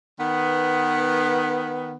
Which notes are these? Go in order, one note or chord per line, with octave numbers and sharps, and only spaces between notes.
D#3 B3